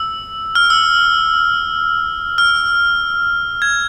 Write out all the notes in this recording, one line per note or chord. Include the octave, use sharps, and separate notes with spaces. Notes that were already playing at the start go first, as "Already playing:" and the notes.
Already playing: E6
F6
E6
F6
G#6